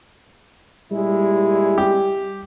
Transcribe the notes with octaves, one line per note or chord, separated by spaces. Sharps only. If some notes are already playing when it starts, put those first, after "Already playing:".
A#2 G3 G#3 E4
G4